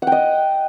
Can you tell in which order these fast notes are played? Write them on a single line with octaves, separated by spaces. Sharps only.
F#5 G5 D#5